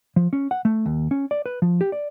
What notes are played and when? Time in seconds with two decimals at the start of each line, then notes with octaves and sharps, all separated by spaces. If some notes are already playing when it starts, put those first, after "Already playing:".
0.16 F3
0.33 C#4
0.51 F#5
0.65 A3
0.86 D#2
1.11 C#4
1.31 D5
1.46 B4
1.62 F3
1.81 G4
1.92 D5